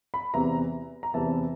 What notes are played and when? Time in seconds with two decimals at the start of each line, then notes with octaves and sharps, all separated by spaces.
0.14 B5
0.34 E2 C3 E3 A#5
1.03 A#5
1.14 E2 C3 E3 A5